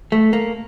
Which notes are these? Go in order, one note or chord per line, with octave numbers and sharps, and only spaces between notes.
A3
A#3